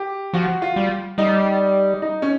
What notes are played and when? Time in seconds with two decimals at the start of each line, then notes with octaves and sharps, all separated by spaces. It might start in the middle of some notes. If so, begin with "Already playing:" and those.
Already playing: G4
0.33 F3 F#4
0.62 F4
0.76 G3
1.18 G3 D#4
2.02 D#4
2.22 C#4